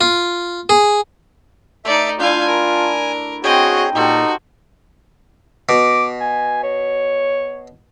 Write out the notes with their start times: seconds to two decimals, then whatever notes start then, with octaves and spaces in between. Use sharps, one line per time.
0.01 F4
0.69 G#4
1.85 A3 D#4 D5 E5
2.20 D4 E4 F4 F5 G#5 G6
2.48 A#4 G#5
3.44 C4 F#4 G#4 C#5 D#5 G5
3.95 A#2 D#4 F#4 G4 A4 C5
5.69 B2 D6
6.21 G#5
6.63 C#5